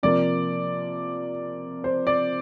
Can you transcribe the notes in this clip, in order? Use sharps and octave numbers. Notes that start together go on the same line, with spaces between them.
C3 F3 A#3 D5
C5
D5